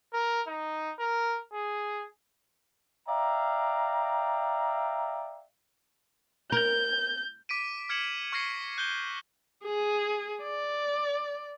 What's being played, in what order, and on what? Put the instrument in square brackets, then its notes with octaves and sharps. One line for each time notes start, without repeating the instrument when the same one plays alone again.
[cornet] A#4
D#4
A#4
G#4
[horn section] D5 E5 F5 G5 A#5
[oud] A#4 [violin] G6
[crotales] D6 B6 D7 D#7
D6 F6 G#6 C#7 E7 F#7
C#6 F6 G#6 A#6 C7 C#7
F#6 G6 C#7 G7
[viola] G#4
D5